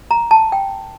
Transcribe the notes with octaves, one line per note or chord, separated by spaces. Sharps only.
A#5
A5
G5